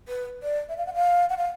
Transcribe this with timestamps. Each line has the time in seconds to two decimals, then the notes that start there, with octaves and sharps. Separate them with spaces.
0.08 B4
0.43 D5
0.69 E5
0.78 F5
0.87 F#5
0.94 F5
1.29 F#5
1.38 F5